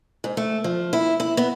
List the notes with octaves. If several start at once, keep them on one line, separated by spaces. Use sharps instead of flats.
G#2
A3
F3
E4
E4
B3